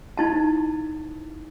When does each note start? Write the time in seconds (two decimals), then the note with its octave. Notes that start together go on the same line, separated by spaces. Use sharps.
0.17 D#4 E4 A5